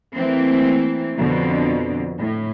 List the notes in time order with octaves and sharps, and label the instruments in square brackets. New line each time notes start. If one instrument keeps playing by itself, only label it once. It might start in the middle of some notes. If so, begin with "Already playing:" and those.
[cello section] E3 A3 A#3 C4
F2 B2 D3
A2